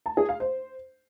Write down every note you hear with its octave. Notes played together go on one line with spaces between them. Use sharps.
A5
G#4
F5
C5